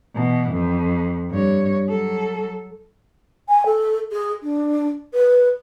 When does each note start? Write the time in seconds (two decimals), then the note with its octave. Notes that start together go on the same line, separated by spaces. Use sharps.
0.15 B2 E3
0.52 F2
1.30 G2 C#5
1.89 F#3 A4
3.49 G#5
3.66 A4
4.12 G#4
4.43 D4
5.14 B4